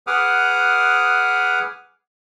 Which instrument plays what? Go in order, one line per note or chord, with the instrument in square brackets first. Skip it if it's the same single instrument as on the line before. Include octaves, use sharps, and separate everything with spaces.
[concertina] G#4 B4 F#5 D6 D#6 F6